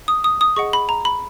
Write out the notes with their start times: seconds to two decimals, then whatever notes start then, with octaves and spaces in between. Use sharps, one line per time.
0.08 D#6
0.24 D#6
0.41 D#6
0.56 G#4 D#5 F#5 C#6
0.73 B5
0.89 A#5
1.05 B5